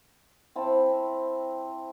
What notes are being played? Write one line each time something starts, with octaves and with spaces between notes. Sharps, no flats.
C4 E4 A5